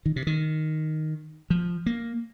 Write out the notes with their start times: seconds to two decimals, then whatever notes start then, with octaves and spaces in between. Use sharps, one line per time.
0.06 D#3
0.16 C3
0.27 D#3
1.50 F3
1.86 A#3